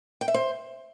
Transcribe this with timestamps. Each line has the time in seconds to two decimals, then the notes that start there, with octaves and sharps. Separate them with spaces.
0.21 G5
0.28 E5
0.34 C5